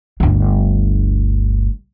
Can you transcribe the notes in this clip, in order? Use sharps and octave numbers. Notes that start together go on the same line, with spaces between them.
G1 D2